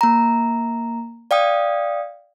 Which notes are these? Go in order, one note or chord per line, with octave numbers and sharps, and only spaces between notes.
A#3 A#5
D5 F5 G5 D#6